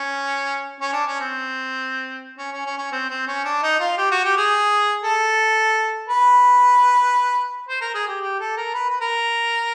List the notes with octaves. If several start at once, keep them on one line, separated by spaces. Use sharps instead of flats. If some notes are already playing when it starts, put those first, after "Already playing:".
Already playing: C#4
C#4
D4
C#4
C4
C#4
C#4
C#4
C#4
C4
C4
C#4
D4
D#4
F4
G4
F#4
G4
G#4
A4
B4
C5
A#4
G#4
G4
G4
A4
A#4
B4
B4
A#4